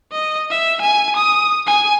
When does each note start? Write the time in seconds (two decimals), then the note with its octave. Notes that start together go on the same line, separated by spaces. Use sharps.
0.12 D#5
0.50 E5
0.82 G#5
1.17 D#6
1.67 G#5